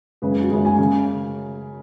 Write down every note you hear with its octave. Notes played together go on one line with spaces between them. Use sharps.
F#2 C#3 G#3 B4
G#4
F#4
F#2 C#3 G#3 G#4
G#5
C#3